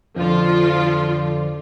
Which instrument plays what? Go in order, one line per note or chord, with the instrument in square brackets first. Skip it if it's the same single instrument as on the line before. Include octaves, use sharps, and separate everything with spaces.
[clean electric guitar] F2 D3 [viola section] F3 F4